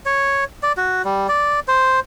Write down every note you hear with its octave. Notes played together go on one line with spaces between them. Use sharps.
C#5
D5
F#4
G3
D5
C5